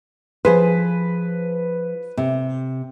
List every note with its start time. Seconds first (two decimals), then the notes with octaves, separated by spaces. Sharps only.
0.45 F3 G#4 B4 C5
2.17 C3